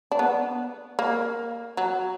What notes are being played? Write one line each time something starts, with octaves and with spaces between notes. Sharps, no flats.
D4
B3
A#3
F#3